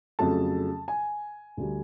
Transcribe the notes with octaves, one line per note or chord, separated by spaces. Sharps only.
F2 C#3 F#3 A3 A5
G#5
D2 D3 G3